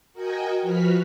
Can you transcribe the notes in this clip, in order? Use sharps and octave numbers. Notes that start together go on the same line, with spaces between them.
F#4 A#4 D#5 G5 G#5
F3 F#4 B4 F6 B6